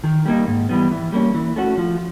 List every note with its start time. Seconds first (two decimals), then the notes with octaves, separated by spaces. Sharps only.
0.04 D#3
0.26 G3 A#3 D#4
0.47 G#2
0.69 E3 G3 B3
0.91 E3
1.12 G3 A#3 C#4
1.34 E3
1.56 A3 C#4 F#4
1.77 F3